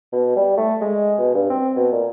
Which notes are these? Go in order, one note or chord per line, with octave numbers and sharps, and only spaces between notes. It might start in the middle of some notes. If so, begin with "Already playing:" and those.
B2
G3
A3
G#3
B2
G2
C4
B2
A#2